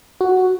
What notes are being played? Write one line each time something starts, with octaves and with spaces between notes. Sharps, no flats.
F#4